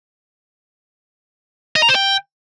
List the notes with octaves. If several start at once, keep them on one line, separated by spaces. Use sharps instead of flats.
D#5
A#5
C5
G5